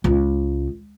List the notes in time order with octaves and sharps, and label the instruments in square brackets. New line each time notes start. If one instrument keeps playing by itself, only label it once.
[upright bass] C#2